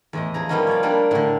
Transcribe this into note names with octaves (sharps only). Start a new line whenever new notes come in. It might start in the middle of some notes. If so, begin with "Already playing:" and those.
E2 A2 D#5
F3 G#4 A#5
F3 G3 A#3 B3 C#4 D#4
C#5 D5 F5
G3 A#3 D4
A2 D3